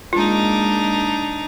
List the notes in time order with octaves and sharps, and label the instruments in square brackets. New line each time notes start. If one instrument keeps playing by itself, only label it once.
[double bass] G#3 A#3 [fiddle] D4 D#4 [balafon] F4